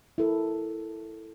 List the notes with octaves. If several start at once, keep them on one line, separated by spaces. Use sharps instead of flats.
E4 A4 A#4